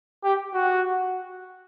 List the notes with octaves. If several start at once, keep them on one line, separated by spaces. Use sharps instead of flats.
G4
F#4